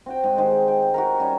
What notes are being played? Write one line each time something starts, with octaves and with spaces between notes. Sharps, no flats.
C4 F#4 G5
G#2
D#3 G#3 G4 C5
G5
F#4 G4 A#4
G3 C#4 F#4